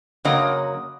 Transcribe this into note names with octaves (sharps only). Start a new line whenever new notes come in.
F#2 C#3 F#3 A#3 D#5